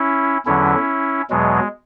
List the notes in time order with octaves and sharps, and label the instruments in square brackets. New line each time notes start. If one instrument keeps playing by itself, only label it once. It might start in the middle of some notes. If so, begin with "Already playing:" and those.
Already playing: [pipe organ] C#4 E4
E2 D3 F#3 C#4 E4
E2 B2 F#3 G#3